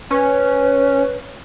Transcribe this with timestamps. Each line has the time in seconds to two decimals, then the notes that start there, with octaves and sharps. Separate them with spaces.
0.11 C#4 B4